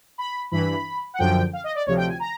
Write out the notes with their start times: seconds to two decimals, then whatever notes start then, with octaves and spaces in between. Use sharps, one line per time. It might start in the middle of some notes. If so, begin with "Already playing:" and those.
0.18 B5
0.51 G2 E3 B5
1.14 F#5
1.19 F#2 D3 F3 G5
1.53 F5
1.64 D#5
1.75 D5
1.86 D2 C3 F3 C#5
1.97 G5
2.08 G#5
2.20 A#5